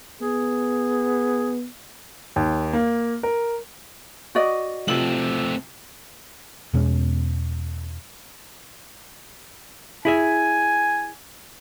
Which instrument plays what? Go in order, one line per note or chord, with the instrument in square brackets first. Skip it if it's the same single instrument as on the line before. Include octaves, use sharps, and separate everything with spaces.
[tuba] B3 [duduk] G#4
[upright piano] D#2
A#3
A#4
[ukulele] F#4 D5 D#5
[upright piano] C3 F3 F#7 [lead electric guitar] A3 C4
[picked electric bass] E2 B2 G#3 C#4
[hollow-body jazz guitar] E4 G#4 E5 [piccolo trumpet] G#5